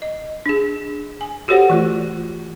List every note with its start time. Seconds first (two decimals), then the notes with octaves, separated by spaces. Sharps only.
0.02 D#5
0.46 D4 G#4
1.21 G#5
1.48 F#4 G4 A4 C5 C#5 F#5
1.70 E3 A3 F4